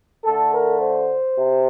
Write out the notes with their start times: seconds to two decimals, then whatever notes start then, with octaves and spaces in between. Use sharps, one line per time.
0.24 D3 A3 A4
0.53 A#4
0.80 C5
1.38 C3